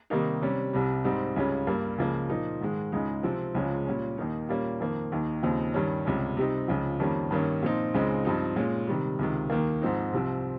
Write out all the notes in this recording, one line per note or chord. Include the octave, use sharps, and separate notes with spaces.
C3 D#3 G3 A#3 D#4
C3 G3 C#4
C2 C3 G3
G#2 G3 C4 D#4
C#2 C#3 G3 C#4
G2 G3 A#3
C#2 C#3 F3 A#3
A#2 F3 A#3 D#4
G#2 D#3 G#3
C#2 C#3 G#3 D#4
C3 F3 C4
C#2 C#3 F3 G#3 C#4
A#2 G3 C#4
D#2 D#3 A#3 D#4
A#2 G3 A#3 C#4
F2 D#3 A#3
D#2 D#3 A#3 D#4
D#2 C#3 F3 C4 D#4
G2 D#3 G3 C#4
C#2 C3 G3 C#4
C3 G3 C4 D#4
C#2 C#3 F3
F2 D#3 G3 A#3 C#4
G2 D#3 A#3 C#4
A#2 F3 C4 D#4
C#2 C#3 G#3 C4 D#4
G2 F3 C4 D#4
A#2 G#3 C#4
C3 D#3 G3
C#2 C3 D#3
D#2 D#3 A#3
G#2 F3 C4 D#4
C2 C3 F3 C4